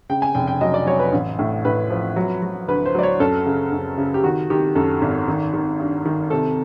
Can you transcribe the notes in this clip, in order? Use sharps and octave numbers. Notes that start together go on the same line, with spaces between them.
C#3 G5
G#5
F1 G5
G5
F#3 D#5
D5
F#3 C#5
B4
A1
A2
A2 B4
F3
F#3
F#3
D2 B4
C5
F#3 D5
C#5
F#2 A4
C#3
F#2
C#3
G4
D#3 F#4
D#3 G4
F#2 A4
G#1
D#3
D#3
G2
D#3
C3 A4